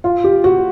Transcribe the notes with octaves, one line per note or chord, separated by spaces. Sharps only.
F4
G4
F#4